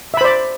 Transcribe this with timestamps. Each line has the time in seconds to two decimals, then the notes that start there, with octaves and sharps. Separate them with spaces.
0.14 E5
0.17 B5
0.21 C5
0.24 D5